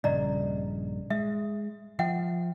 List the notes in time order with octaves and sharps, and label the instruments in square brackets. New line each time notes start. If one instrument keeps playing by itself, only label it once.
[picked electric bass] A#1 G2 C#3 [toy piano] D5 D#5 A#5
[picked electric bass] G#3 [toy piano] E5
[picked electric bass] F3 [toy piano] E5 F#5 G5